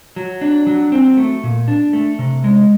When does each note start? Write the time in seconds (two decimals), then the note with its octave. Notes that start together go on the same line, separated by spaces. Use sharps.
0.16 F#3
0.41 D4
0.67 F#3
0.92 C4
1.17 A3
1.44 A#2
1.68 D4
1.93 A3
2.19 C3
2.44 G#3